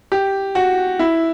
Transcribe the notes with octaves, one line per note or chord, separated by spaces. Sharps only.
G4
F#4
E4